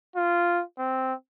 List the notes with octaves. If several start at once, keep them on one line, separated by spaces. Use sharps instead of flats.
F4
C4